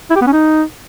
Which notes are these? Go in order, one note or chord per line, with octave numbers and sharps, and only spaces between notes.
E4
G4
B3
C#4
D#4